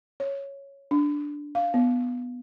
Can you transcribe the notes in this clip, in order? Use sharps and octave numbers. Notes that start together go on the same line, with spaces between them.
C#5
D4
F5
B3